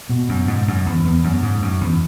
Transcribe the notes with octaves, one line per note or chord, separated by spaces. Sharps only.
B2
F#2
G#2
F#2
E2
E2
F#2
G#2
F#2
E2